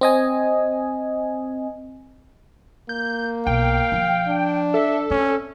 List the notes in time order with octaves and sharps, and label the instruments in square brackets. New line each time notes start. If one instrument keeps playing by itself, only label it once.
[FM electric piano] C4 D#5 G#5
[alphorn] A#3 [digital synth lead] G6
[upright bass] B1 [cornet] F5 [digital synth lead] G5
[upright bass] F3
[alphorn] D4
[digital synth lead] A4 [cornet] E5
[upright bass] C4 [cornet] C#4